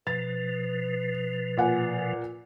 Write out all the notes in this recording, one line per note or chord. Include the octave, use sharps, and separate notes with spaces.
B2 F3 B4 A6
A#2 F#5 G#5